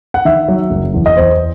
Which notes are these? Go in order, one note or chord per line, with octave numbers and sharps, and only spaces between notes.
F#5
D#3 E5
F#3
F#1
E2
D#5
E2 C5